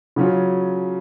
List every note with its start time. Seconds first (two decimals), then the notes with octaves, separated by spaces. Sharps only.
0.16 C#3 F#3 C#4 F4